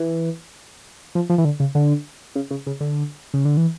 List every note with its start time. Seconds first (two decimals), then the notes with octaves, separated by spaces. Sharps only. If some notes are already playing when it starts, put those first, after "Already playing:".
Already playing: E3
1.15 F3
1.30 F3
1.38 E3
1.45 D3
1.60 C#3
1.75 D3
2.35 C#3
2.51 C#3
2.67 C#3
2.80 D3
3.34 C#3
3.45 D3
3.57 E3